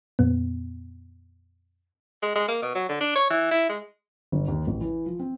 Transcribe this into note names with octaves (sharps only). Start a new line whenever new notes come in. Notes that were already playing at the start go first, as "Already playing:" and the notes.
F2 A#2 B3
G#3
G#3
A#3
B2
F#3
D3
D4
C#5
E3
E4
G#3
G1
D#2
A1
E3
F3
C4